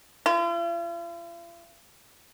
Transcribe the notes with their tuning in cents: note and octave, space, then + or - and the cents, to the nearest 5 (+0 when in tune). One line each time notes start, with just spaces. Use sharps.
F4 -45